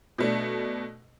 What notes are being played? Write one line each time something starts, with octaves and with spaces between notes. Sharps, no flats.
B2 A3 D4